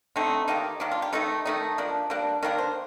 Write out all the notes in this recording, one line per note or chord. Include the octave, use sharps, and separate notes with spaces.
D3 A3 C4 D#4
D#3 A#3 D#4 G4
D#3 A#3 D4
F4
G4
D#3 A3 D#4 A4
D#3 A3 D#4
F3 A#3 D4
G3 A#3 D4
D#3 A#3 D4 A#4
C5